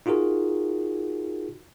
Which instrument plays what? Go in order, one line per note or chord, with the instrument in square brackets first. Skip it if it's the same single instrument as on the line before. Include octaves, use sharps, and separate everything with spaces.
[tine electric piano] D#4 F4 F#4 G#4 A#4